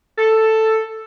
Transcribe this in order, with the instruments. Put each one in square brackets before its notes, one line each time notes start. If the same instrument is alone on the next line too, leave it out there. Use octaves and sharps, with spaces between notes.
[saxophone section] A4